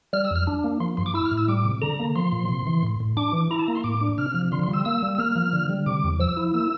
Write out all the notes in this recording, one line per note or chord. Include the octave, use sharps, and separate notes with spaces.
G3 F6
E6
F2 F6
D4
A#3
F3 C6
G2 C6
D6
E4 E6
F6
A2
E6
G3 D6
C3
D3 A#5
A#3
F3 C6
A#2
C3
E3
A2
A2
D4 D6
E3
E4 A#5
A5
A#3 A#5
C6
A2 D6
D4
C3 F6
F3
D3 C6
C6
G3
E6
A#3 E6
G3
E6
A#3 F6
F3
D3
G3
C3 D6
E2
F3 E6
E4
A#3 E6